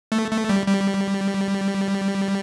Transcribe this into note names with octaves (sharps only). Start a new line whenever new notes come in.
A3
A3
G3
G3